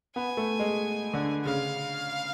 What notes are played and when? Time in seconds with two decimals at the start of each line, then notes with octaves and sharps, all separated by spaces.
0.16 B3 G#5
0.37 A3
0.60 G#3
1.14 D3
1.45 C#3 F5